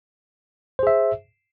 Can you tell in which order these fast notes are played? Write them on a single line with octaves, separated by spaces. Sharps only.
C5 G#4 E5